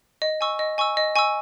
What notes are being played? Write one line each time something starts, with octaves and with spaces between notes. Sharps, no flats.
D#5
G#5 C#6 E6
D#5
G#5 C#6 E6
D#5
G#5 C#6 E6